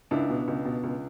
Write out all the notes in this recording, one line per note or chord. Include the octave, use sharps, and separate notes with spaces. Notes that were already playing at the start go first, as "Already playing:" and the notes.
C#2 D4 E4
B2
C#2
B2
C#2